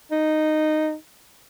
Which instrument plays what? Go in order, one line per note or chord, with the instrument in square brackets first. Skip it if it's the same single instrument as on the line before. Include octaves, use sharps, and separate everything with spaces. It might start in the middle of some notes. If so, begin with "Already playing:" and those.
[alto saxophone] D#4